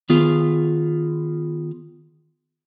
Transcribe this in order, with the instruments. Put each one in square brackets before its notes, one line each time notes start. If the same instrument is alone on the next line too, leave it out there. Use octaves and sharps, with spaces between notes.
[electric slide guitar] D#3 B3 F4 G#4